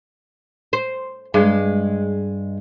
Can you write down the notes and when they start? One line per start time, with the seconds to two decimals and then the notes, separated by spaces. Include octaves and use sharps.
0.73 C5
1.34 G2 G#3